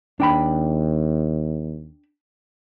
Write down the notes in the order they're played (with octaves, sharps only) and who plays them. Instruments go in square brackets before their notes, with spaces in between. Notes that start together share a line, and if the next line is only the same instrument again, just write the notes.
[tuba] D#2 [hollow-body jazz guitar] D4 G5 B5